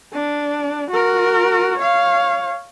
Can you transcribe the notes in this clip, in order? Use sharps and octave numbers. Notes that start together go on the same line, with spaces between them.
D4
F#4 A#4
C#5 F5